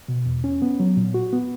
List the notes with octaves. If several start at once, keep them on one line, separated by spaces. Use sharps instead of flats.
B2
E2
C#4
B3
F#3
A#2
F#4
B3